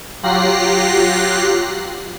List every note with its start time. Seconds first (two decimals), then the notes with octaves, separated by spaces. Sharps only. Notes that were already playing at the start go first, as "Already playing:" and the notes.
0.23 F#3 F4 G4 F#6 A#6 C7